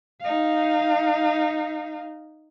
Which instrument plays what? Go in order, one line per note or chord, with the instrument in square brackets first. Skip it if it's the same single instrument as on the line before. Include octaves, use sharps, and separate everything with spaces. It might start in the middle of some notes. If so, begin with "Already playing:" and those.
[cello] D#4 F5